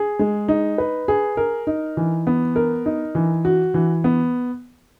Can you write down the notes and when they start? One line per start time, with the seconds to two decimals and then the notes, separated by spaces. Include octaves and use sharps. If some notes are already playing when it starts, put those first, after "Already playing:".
Already playing: G#4
0.19 G#3
0.49 D#4
0.78 B4
1.08 G#4
1.37 A#4
1.67 D#4
1.97 E3
2.27 B3
2.56 A#4
2.86 D#4
3.15 E3
3.45 F#4
3.74 E3
4.04 B3